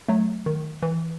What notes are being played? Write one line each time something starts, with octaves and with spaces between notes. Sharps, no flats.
F#3 A3
D#3
E3